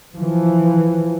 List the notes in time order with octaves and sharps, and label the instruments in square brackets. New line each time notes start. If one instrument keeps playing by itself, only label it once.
[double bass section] E3 F3